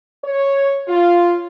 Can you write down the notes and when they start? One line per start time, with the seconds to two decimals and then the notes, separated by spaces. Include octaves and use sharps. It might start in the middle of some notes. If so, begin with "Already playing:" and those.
0.24 C#5
0.88 F4